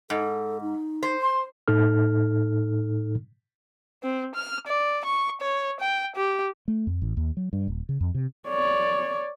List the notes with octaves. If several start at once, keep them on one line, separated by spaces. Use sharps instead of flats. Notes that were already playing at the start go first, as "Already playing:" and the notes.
G#2 A4
D#4
C5
C6
A2 D#4 A4 F6
C4
F6
D5
C#6
C#5
G5
G4
A3
F2
A1
D#2
F#3
G2
D#1
C#3
F2
C3
C#5 D5